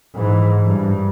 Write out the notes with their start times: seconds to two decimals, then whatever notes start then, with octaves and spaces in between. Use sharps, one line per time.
0.14 G#2 E3
0.65 G2